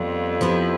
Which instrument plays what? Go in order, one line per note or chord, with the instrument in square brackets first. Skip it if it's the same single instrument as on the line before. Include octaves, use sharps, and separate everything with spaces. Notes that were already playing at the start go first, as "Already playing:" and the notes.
Already playing: [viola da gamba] F2 [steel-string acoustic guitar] G3 B3 F4
[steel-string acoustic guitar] F3 B3 E4 G4 B4